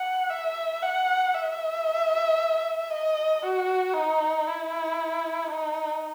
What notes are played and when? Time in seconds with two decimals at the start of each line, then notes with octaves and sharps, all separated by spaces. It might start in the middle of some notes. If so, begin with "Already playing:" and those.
Already playing: F#5
0.30 E5
0.82 F#5
1.34 E5
2.90 D#5
3.43 F#4
3.94 D#4
4.47 E4
5.51 D#4